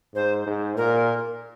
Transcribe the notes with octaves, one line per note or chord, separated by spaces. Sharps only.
G#2 C5
G#2
A#2 A#4